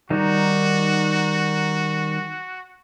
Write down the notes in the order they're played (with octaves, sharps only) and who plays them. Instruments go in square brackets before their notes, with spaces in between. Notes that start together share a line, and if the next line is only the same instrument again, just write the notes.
[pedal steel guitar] D#3 G3 D#4 [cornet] F#4